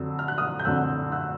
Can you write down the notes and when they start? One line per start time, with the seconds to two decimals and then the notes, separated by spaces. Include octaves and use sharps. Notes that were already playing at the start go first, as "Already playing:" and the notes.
Already playing: F2 D3 F#3 E6
0.19 F6
0.28 F#6
0.38 D#6 F6
0.59 G6
0.65 F2 D3 F#3 E6 F#6
1.12 E6 F#6